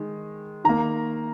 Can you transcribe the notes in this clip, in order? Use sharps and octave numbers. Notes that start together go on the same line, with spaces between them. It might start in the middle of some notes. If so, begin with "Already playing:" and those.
Already playing: D#3 G#3
D#3 A#3 A#5